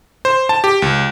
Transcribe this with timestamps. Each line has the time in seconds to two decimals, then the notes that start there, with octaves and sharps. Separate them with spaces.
0.25 C5
0.49 A5
0.64 G4
0.82 C#2